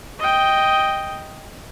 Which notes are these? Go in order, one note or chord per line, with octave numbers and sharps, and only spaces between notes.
D#5 G5